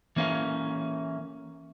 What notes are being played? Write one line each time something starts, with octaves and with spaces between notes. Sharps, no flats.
E3 A#3 C#4